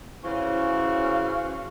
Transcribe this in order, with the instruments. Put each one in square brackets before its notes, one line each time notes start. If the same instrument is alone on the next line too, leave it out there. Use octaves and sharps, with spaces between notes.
[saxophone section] C#3 E3 C#4 F#4 C5 F5